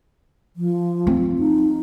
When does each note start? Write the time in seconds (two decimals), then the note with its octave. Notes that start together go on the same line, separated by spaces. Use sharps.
0.56 F3
1.07 C4
1.38 D#4